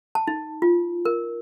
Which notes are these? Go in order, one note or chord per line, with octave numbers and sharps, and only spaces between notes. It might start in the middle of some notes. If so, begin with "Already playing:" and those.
A5
D#4
F4
A#4